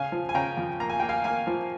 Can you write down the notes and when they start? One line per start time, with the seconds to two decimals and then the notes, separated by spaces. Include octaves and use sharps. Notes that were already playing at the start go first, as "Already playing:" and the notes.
Already playing: C#3 F5 G#5
0.12 F3
0.29 G#5
0.34 C#3 G5 A#5
0.57 F2
0.80 A#3 A#5
0.90 G#5
1.00 A#3 G5
1.09 F5 G#5
1.24 A#3 F5 G#5
1.47 F3